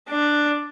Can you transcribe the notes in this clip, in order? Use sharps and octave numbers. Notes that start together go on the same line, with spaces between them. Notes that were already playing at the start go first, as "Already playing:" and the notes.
D4